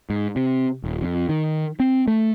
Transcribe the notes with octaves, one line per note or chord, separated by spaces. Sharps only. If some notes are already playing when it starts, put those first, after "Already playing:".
G#2
C3
D#1
F2
D#3
C4
A3